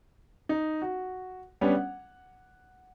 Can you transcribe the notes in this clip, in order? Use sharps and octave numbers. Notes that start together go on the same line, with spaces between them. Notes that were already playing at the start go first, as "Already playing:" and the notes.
D#4
F#4
G3 B3 C#4 D4
F#5